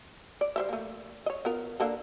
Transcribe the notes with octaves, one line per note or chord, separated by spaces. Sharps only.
D5
G3 C5 E5
A3 A#3
C#5 D#5
B3 F4 A#4
D3 A#3 A4